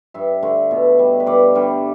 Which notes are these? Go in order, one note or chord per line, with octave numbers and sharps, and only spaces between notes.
G2 E5
D3 A3
B2
G3
B4
G2 D5
D3 G3